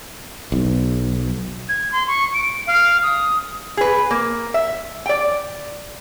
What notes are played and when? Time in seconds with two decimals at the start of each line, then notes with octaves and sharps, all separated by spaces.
0.52 B1
1.69 G#6
1.92 C6
2.08 C#6
2.34 D7
2.67 F5
3.03 D#6
3.77 G#4 B4
4.11 A#3
4.54 E5
5.06 D5 G5